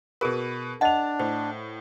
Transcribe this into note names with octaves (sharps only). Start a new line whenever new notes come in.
B2 G#4 A#4 B4
D4 D#5 F#5 A5 F7
A2 C5